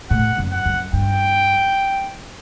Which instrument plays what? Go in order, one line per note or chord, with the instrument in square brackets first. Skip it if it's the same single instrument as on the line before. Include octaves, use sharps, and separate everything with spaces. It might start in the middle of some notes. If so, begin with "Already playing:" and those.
[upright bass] A2 [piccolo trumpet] F#5
[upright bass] F#2
[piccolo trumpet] F#5
[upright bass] F#2
[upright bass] G2 [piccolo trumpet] G5